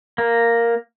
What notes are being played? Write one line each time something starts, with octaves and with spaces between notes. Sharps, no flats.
A#3